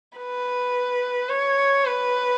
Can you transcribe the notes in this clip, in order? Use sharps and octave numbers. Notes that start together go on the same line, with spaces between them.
B4
C#5
B4